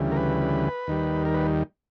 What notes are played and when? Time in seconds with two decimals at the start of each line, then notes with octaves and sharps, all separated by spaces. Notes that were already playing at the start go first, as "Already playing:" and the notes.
Already playing: D2 C#3 E3 G3
0.12 A#4
0.17 B4
0.87 D#2 D#3 G3
1.25 A#4
1.34 B4